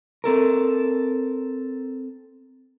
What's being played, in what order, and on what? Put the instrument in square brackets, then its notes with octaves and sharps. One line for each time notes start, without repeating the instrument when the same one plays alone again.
[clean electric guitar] C4 A4 A#4